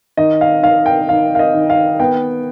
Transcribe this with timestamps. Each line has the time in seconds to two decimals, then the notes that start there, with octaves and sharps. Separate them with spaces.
0.17 D#3 D#5
0.41 F5
0.63 D#3 F5
0.86 G5
1.09 D#3 F5
1.35 F5
1.39 D#5
1.54 D#3
1.70 F5
2.00 B3 G5